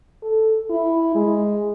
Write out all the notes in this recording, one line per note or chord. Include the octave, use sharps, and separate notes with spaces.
A4
E4
G#3